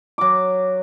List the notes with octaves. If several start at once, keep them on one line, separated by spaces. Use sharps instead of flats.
F#3 D6